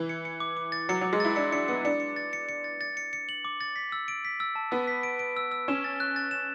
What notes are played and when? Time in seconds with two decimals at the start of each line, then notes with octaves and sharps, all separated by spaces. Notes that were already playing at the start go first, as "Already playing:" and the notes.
Already playing: E3
0.09 C#7
0.25 C#7
0.40 D6
0.57 D6
0.72 A6
0.89 F#3 C#7
1.01 F#3 D6
1.13 G#3
1.20 E4 A6
1.36 D4 C#7
1.52 D4 C#7
1.68 B3 C#7
1.85 D4 C#7
2.00 C#7
2.16 A6
2.33 C#7
2.49 C#7
2.64 A6
2.81 A6
2.97 C#7
3.13 C#7
3.29 F#7
3.45 D6
3.61 A6
3.76 B6
3.92 E6
4.08 D7
4.25 B6
4.40 E6
4.55 A5
4.71 B3 E6
4.87 B6
5.03 D7
5.19 D7
5.37 E6
5.51 E6
5.68 C#4 E7
5.84 A6
6.00 F#6
6.16 A6
6.31 E7